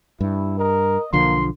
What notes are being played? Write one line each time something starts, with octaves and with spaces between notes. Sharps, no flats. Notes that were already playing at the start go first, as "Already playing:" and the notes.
G2 E4
A#4 D#5
B1 D3 F3 A#3 C6